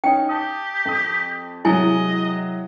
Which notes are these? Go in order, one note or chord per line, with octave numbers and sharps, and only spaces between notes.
C#4 D#4 G5
G4 A5 D#6
F2 D#6
C3 F#3 G#3 E4 D#5 G#5